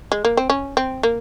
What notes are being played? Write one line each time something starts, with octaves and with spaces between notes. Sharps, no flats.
G#3
A#3
C4
C#4
C4
A#3